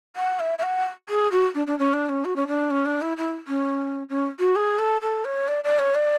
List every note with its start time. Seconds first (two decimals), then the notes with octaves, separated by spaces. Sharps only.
0.16 F#5
0.39 E5
0.58 E5
0.63 F#5
1.09 G#4
1.31 F#4
1.54 D4
1.67 D4
1.79 C#4
1.93 D4
2.09 C#4
2.25 F#4
2.36 C#4
2.47 D4
2.70 C#4
2.85 D4
3.01 E4
3.17 E4
3.47 C#4
4.09 C#4
4.39 F#4
4.55 G#4
4.79 A4
5.01 A4
5.25 C#5
5.48 D5
5.64 D5
5.79 C#5
5.95 D5